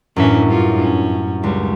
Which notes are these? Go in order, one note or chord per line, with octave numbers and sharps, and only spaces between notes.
F#2 A2 E3 C#4 D4 E5
G2 F4
C#4
C#2 G3